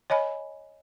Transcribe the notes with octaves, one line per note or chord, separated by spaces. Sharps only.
C#5 D#5 G#5 B5